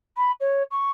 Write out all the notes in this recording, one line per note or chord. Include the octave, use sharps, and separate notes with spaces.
B5
C#5
C#6